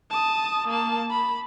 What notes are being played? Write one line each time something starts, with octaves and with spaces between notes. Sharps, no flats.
A5 D#6
A#3 A5
B5